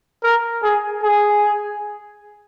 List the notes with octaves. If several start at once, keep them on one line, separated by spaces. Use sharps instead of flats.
A#4
G#4
G#4